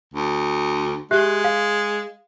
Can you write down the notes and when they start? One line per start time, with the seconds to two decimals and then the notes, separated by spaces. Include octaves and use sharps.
0.14 D2
1.11 G#3 G4 E5 F#6
1.44 F5